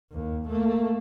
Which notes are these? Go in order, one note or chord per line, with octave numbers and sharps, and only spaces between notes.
D#2
A3 A#3